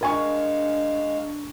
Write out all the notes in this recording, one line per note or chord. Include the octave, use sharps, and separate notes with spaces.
G#3 D4 A#4 F5 G#5 C#6